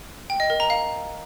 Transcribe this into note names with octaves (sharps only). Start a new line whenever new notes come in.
G5
D#5
A#4
A#5
F5